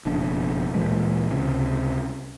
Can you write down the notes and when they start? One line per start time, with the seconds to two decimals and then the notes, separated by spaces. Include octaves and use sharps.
0.05 F#1 F2 B2 D4
0.75 D2 A#2 E3 G#3
1.30 C#2 C3